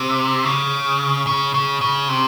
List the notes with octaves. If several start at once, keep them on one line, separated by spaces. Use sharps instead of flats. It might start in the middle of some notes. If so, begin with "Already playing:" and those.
Already playing: C3
C#3
C#3
C#3
C#3
C3